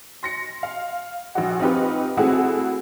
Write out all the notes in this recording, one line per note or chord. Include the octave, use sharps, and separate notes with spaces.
C6 A#6 C#7
F5
A#1 F#4
C4 D#4 F4 G4 B4
A3 C4 E4 F#4 G#4